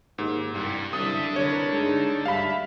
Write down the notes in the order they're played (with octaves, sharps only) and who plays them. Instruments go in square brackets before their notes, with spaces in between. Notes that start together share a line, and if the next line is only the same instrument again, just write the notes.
[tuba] D#2 [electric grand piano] G#2
[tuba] C2 [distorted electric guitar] G2 G3
[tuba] C2 [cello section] F#2 G3 E5 [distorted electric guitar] D4 A4 [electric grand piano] D#6
[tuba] C2 [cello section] D3 A#4 B4 [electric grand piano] C#5
[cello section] G2 A3 D#4 [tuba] G#3
[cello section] D2 G2 E5 [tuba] G3 [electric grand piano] F5 B5